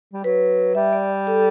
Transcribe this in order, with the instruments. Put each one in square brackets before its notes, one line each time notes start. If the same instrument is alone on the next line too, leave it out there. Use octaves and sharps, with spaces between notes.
[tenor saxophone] G3
[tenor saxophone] F#3 [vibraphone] B4
[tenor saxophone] G3 [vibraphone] E5
[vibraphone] D5
A4